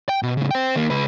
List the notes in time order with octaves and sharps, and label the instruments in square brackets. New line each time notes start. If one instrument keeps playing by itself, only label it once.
[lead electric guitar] G5
B2
A2 C#3
C5 G5
D#2 A#3
C#2 B4